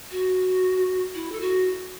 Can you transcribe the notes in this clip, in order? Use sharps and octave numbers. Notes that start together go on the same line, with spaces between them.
F#4
E4
A4
F#4